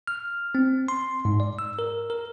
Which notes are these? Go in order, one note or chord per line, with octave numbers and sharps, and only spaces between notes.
F6
C4
C6
G#2
D5
E6
A#4
A#4